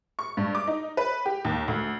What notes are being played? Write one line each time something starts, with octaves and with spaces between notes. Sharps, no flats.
C#6
G2
D6
D#4
B4
G4
D#2
D2